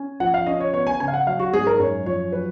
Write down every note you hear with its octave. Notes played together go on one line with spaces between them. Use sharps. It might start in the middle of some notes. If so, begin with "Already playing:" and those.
Already playing: C#4 G#5
F3 F#5
F5
C#4 D#5
C#5
B3 C#5
G#5
C#3 G#5
F5
F#5
F#3 F5
F#4
G#2 G#4
A#4
F#2 C#5
F3 C#5
F#3 B4